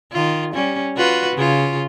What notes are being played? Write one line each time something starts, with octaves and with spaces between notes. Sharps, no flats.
D#3 F4
G3 C#4
F4 F#4 B4
C#3 F4